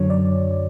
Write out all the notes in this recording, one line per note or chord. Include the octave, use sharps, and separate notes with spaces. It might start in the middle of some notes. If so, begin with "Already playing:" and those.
Already playing: F#2 D3 F#3 C#5
D5